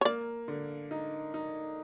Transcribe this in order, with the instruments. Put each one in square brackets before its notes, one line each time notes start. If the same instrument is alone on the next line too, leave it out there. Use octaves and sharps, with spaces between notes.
[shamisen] C#5
[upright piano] A#3 [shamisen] D5
[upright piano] D3
D#4
D#4